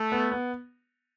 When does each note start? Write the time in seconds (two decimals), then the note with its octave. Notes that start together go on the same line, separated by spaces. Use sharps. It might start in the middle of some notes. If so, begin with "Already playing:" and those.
Already playing: A3
0.12 B3
0.32 B3